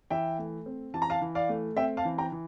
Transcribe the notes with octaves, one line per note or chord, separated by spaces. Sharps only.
E3 E5 G5
A3
C4
E3 A5
A#5
F5 A5
E3
D5 F5
A3
C4 E5 G5
F5 A5
E3
G5 A#5
E3